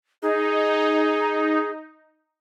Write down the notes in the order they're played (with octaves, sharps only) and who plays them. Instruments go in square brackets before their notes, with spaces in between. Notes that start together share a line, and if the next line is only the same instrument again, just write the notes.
[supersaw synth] D#4 [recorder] G#4